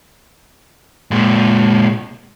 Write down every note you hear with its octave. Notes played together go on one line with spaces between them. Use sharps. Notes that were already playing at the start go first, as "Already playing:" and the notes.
A#2 G#3